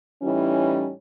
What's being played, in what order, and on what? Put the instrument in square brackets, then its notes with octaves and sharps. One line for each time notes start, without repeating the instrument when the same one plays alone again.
[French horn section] A2 E3 G3 C#4 D#4 E4